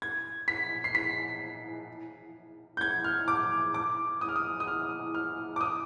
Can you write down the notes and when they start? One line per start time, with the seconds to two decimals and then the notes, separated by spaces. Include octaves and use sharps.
0.02 G#6
0.48 B6
0.84 C7
0.95 B6
2.77 G6
2.81 G#6
3.04 F6
3.28 D6
3.74 D6
4.21 D#6
4.29 F6
4.36 D#6
4.60 D#6
4.68 F6
5.15 F6
5.56 D6
5.61 D#6